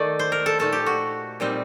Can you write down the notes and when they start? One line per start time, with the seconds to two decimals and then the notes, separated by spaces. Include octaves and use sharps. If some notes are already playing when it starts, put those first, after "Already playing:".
Already playing: D#3 A3 D#4 D5
0.19 C5
0.32 A#4
0.46 A4
0.59 A#2 A3 D#4 A4
0.72 G4
0.86 F#4
1.40 A#2 G3 C4 D#4